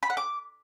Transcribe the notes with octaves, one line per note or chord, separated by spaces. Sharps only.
B5
F#5
D6